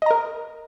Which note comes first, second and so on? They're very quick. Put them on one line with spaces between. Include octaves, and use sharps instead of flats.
D#5 A#5 A#4